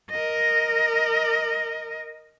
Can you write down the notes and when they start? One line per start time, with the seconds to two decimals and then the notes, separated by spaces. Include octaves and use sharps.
0.11 A#4 D#5